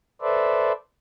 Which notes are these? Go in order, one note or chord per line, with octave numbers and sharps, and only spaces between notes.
A4 B4 C5 D5 E5